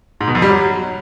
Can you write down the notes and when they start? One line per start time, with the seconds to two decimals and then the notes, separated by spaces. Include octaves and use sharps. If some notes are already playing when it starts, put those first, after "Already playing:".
0.21 G#2
0.28 B2
0.35 F2
0.42 G3
0.49 F#3